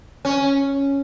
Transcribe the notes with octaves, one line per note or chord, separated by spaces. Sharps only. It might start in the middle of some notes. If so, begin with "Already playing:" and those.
C#4